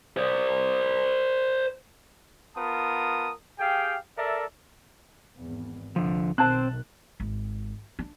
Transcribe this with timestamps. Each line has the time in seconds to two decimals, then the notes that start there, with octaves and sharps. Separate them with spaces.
0.17 C5 D5
2.56 B3 F4 A#4 A5 D#6
3.59 G4 G#4 F5 G5
4.17 A4 A#4 D5 E5
5.39 G#1 E2
5.96 C2 A#2 D3 F3
6.38 B1 D#3 C4 C5 A5 F#6
7.20 G#1
7.99 D4